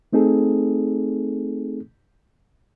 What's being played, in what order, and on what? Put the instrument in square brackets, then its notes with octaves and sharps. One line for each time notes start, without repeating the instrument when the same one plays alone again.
[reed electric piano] A3 C4 D#4 G#4 A4